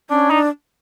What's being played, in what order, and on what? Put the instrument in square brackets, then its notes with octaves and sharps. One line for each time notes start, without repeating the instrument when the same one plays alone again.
[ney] C#4 [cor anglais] D4
[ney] D4 [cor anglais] D#4